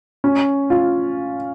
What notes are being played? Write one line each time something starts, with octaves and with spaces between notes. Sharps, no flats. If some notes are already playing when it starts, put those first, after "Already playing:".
C#4
F4